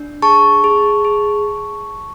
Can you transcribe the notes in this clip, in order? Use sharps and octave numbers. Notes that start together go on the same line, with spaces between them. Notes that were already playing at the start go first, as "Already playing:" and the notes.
Already playing: D4
G#4 A5 C#6
G#4
G#4